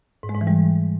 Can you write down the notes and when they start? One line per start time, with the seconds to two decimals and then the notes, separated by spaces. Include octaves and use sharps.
0.23 G#2
0.29 G#3
0.35 G#2
0.41 E3
0.47 G3